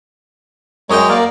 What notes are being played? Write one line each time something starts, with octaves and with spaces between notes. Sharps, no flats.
F#2 G#3 C#5 D#5 G5
A#3 A#4 D5